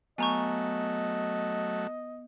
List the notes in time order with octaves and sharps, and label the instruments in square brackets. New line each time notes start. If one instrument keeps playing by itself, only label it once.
[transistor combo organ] F#3 A3 [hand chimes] B3 G6 [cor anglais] D#5 [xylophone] G#5 A#5 C#6